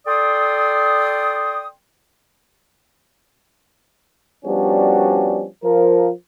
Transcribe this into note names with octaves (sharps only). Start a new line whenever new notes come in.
A4 D5 G5 C6 D#6
F3 G3 B3 C#4 D4 F#4
F3 A#4